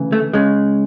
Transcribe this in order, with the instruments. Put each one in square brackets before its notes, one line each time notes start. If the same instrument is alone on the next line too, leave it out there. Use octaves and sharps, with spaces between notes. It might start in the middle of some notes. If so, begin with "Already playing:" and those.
Already playing: [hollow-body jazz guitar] D2 C#3 E3
A3
C#3 G#3